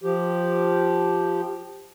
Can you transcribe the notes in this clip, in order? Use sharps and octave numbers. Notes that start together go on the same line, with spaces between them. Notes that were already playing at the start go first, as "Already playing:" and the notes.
F3 G4